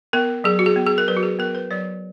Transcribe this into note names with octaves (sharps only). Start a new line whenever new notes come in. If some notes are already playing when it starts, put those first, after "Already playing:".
B3 A#4
F#3 G#4
F#4
G#4
B3
G#4
A#4
F#3 B4
F#4
G#4
B3 A#4
B4
F#3 C#5